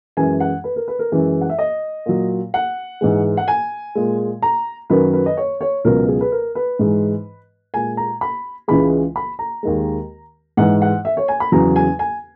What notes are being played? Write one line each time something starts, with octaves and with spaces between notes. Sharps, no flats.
F#2 E3 G#3 G#5
F#5
B4
A#4
B4
A#4
F#2 E3 G#3
F#5
E5
D#5
A#2 F#3
F#5
G#2 E3 G#3
F#5
G#5
A#2 G#3
A#5
F#2 D#3 F#3 B4
B4
D#5
C#5
C#5
C#2 B2 F#3 A#4
G#4
B4
A#4
B4
G#2 E3 G#3
A#2 G#3 G#5
A#5
B5
C#2 C#3 E3 G#3 B5
B5
A#5
D#2 D#3 G#3
G#2 E3 G#3 F#5
F#5
E5
C#5
G#5
B5
E2 C#3 F#3 A#5
G#5
G#5